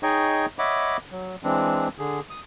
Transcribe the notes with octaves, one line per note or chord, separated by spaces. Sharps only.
D#4 G#4 C#5 D#5 G5 C#6
C#5 D#5 E5 F#5 B5 D6
F#3
E3 G#3 C4 D4
D3 G#4
D#6